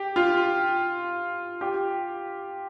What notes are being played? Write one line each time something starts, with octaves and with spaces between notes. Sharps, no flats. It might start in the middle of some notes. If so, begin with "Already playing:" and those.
Already playing: G4
F4
G4